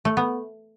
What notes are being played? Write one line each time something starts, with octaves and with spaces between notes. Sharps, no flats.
A3
B3